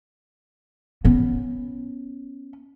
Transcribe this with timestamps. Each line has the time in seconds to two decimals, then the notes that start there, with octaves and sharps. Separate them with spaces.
1.05 B3 C#4